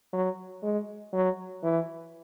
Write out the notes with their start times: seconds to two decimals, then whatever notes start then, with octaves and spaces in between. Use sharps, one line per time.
0.13 F#3
0.63 G#3
1.14 F#3
1.64 E3